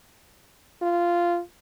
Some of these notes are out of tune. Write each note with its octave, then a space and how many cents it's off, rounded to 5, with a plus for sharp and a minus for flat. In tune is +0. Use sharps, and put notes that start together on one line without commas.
F4 -10